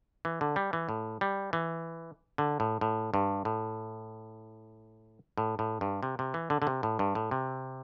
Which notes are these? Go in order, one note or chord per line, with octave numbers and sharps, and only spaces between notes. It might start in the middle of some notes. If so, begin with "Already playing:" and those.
E3
D3
G3
E3
A2
G3
E3
D3
A2
A2
G2
A2
A2
A2
G2
C3
C3
E3
D3
D3
C3
A2
G2
A2
C3